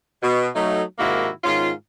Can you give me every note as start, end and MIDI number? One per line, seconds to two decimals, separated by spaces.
0.23 0.49 47
0.56 0.82 54
0.56 0.82 57
0.56 0.82 63
0.99 1.29 44
0.99 1.29 48
0.99 1.29 51
0.99 1.29 58
0.99 1.29 64
0.99 1.29 66
1.44 1.70 44
1.44 1.70 51
1.44 1.70 61
1.44 1.70 65